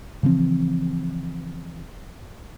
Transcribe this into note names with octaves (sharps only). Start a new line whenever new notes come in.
C#3 E3 F3 C4